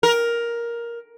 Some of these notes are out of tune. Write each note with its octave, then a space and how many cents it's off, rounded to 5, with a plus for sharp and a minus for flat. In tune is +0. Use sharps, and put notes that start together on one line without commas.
A#4 +10